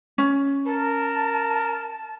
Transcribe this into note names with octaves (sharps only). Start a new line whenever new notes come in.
C#4
A#4 A5